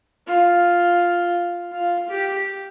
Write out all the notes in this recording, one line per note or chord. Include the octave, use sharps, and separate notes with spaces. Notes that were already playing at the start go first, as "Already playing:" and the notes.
F4
F4
G4